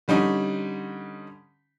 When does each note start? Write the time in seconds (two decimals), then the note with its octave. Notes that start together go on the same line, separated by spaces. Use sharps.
0.08 D3 G3 C#4 D#4